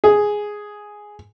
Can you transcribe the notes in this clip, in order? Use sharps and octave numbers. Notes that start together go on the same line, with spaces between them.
G#4